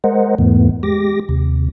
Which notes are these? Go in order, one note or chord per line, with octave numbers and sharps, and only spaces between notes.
G#3 A#4 C5 D#5 F#5
E2 G#2 E3 A3 B3
G#3 G4 D6 A#6
D#2 C3